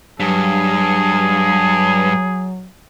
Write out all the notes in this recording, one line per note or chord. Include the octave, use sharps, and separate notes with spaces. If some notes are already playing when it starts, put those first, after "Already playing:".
G2 F#3 G#4